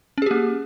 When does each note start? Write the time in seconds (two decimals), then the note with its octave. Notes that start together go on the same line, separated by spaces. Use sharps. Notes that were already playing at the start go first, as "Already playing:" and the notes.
0.18 C#4
0.22 G#4
0.26 G4
0.31 A#3